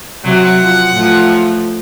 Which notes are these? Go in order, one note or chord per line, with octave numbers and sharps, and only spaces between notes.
C3 F#3 F#5
F3
A2 F3